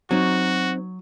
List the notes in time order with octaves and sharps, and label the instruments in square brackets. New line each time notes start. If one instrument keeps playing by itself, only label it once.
[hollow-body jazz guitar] F#3 [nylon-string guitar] C4 D#4 [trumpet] F#4